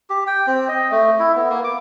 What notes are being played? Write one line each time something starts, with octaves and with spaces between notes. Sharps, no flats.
G4
G5
C4
D#5
A3
E4
B3
A#3
D6